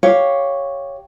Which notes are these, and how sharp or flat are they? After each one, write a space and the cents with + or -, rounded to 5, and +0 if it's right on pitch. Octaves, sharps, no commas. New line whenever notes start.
G4 +0 C#5 +0 F5 +0